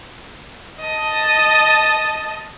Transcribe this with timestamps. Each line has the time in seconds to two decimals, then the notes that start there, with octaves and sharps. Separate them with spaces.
0.82 D#5 A5